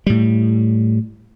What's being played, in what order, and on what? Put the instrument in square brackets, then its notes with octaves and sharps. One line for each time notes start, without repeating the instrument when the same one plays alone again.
[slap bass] A2 G3